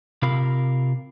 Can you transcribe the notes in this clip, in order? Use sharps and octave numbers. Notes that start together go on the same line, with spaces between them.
C3 F4 A#4 F5 B5